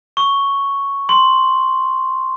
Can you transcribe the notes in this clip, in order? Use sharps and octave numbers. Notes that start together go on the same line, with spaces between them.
C#6
C6